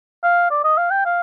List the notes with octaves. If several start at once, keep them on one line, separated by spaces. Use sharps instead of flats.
F5
D5
D#5
F5
G5
F5